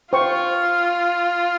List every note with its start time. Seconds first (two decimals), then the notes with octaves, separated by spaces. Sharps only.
0.13 F4 C5 G5 C#6